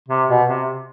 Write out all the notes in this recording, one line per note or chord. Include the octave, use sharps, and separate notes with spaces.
C3
B2
C3